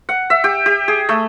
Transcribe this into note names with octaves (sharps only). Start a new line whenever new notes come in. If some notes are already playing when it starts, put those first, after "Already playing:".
F#5
E5
G4
G4
G#4
A3